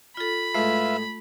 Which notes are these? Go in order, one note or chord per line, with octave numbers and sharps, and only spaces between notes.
F4 A4 B5
A2 G#3 A3 F4 B4 E5